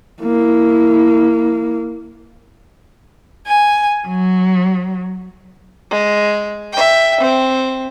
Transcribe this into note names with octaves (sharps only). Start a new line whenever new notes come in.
A#3 E4
G#5
F#3
G#3
E5 G5
C4